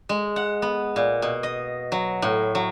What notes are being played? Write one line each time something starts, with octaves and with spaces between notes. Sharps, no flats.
G#3
F#5
B3
A#2
B2
D#5
F#3
A2
F#3